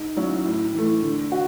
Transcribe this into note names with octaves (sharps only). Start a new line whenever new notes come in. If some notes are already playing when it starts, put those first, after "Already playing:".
Already playing: G#2
F#3 C#4 E4
A2
E3 A3
D3
F#4